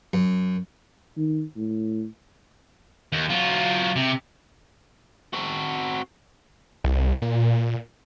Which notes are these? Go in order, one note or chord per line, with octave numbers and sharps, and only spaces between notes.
F#2
D#3
A2
D#2
F#3 F4
C3
C4 F#4
C2
A#2